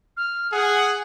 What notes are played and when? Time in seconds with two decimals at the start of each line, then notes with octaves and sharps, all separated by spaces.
0.17 F6
0.52 G#4 F#5